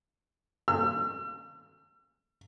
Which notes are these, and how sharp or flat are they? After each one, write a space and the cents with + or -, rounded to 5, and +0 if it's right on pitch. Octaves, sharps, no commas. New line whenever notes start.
E6 +45